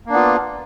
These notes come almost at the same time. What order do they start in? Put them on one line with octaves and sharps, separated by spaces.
A#3 D4 B3 F4